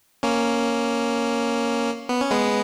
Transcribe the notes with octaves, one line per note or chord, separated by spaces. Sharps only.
A#3 C#4
B3
C#4
G#3 B3